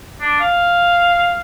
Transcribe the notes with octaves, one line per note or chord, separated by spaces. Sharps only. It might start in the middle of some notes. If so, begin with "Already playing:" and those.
D4
F5